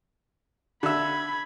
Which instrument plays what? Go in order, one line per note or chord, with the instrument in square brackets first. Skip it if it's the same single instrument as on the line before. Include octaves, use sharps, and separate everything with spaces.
[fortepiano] D3 E5 [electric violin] B5 G#6